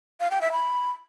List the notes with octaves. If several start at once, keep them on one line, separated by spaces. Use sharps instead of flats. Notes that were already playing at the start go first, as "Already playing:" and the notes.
F5
G5
E5
B5